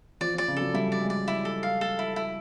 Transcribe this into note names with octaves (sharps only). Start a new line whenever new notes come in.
F3 D5
F3 D5
C#3
F#3 A4
G3 E4
D5
G#3
D5
E4
A4
F5
A4
E4
E4